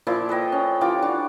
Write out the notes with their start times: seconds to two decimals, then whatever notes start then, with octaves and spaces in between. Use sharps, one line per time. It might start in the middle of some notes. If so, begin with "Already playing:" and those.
0.07 A#2 F3 E4 D6
0.29 A4 B4 D#5 G5
0.52 C#4
0.81 E3 F4 G4 D6
1.02 D4 F#4 F#5